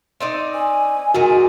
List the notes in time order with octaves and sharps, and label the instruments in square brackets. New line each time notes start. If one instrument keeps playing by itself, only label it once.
[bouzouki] C4 D#4 D5
[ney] G#5
[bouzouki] A#2 D#3 G#3 [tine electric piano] F#4